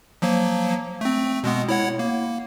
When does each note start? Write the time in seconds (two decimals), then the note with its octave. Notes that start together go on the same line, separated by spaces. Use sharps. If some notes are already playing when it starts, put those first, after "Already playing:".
0.22 F3 F#3 A#3
1.01 A3 C4
1.44 B2 G#3 B3
1.69 E4 C#5 F#5
1.99 A#3